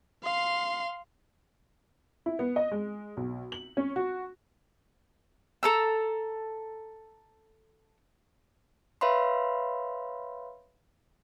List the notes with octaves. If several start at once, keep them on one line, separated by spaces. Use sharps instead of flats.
F5 C6
E4
B3
D#5
G#3
B1
F#7
C#4
F#4
A4 A#5 E6
B4 C#5 E5 F5 B5 C6